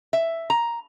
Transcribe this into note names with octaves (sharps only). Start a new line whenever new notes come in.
E5
A#5